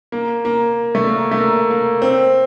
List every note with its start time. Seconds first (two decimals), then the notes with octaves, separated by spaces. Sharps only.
0.12 A#3
0.45 A#3
0.95 A3
1.07 A#3
1.31 A3
1.38 A#3
1.70 A#3
2.02 C4